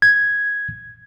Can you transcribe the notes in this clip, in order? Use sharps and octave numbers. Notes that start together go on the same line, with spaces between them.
G#6